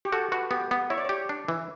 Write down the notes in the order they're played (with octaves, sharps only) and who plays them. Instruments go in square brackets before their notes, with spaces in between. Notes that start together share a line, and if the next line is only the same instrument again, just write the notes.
[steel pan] G4
[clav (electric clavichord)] F#4 [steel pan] A4
[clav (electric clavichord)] F#4 [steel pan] B4
[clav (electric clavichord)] B3 [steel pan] G4
[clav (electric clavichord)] B3
[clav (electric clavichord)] E4 [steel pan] C#5
[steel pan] D5
[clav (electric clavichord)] G4 [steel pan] C#5
[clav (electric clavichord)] D4
E3